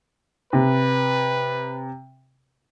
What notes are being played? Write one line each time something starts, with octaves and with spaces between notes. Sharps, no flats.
C3 B4